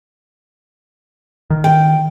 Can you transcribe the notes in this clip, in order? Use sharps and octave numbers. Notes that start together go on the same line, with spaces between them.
D#3
G5